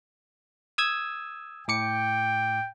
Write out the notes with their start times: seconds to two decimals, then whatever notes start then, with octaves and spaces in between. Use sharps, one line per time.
0.78 D#6 E6 G#6
1.68 A2 G5 D6 C#7